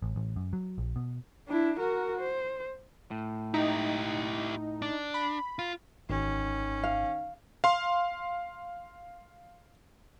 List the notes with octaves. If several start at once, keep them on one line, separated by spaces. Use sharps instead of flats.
A1
A1
F#2
F#3
A#1
B2
D4 E4
F#4 A#4
C5
A2
D#4 E4 G4
D4
B5
F4
G#1 D#3 C#4
F5
F5 C6